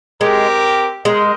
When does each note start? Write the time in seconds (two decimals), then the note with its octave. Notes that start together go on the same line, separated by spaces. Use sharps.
0.21 G#3 C4 G4 A#4
1.05 G#3 A#4 D#5 G5